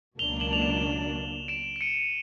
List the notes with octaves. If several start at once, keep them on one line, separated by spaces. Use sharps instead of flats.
C#2 B2 F#3 A#3 D4 F7 G7
G7
E7 F#7
F7
E7 F#7
D7 E7
E7
C#7 D#7